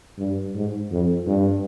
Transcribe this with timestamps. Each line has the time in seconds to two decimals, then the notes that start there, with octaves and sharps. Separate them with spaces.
0.18 G2
0.55 G#2
0.91 F2
1.27 G2